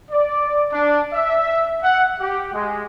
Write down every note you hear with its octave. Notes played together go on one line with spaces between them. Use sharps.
D5
D4
E5
F#5
G4
G#3